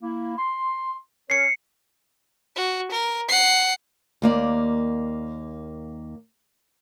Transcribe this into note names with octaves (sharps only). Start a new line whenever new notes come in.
A#3 E4
C6
C#4 A#4 C#5 C7 C#7
F#4
A#4
F#5 C7
D#2 A#3 D5